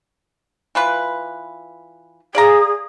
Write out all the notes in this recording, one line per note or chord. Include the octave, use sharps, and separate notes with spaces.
E3 F4 B4
G#4 D5 F5 A#5